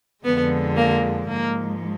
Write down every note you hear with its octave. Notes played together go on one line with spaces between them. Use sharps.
F2 D3 F3 G#3 B3
A#3
G#2 F3 G#3 A#3